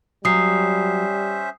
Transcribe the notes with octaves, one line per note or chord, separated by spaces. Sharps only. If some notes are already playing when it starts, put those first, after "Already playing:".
F#3 G3 C#4 C5 E5 D#6 C7